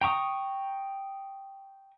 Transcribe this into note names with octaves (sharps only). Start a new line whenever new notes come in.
G5 A#5 C#6 D#6